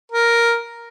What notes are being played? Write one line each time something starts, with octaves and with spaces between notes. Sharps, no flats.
A#4